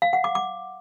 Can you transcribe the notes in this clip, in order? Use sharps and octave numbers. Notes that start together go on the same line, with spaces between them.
F5
F#5
D6
D6